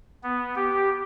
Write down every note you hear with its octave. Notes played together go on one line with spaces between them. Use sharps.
B3
G4